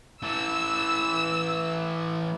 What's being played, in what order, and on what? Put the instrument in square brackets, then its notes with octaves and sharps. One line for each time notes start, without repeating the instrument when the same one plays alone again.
[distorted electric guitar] E3 A3 [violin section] E6